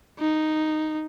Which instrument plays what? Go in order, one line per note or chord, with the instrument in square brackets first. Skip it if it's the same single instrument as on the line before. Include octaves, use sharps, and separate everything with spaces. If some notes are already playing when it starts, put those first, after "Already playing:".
[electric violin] D#4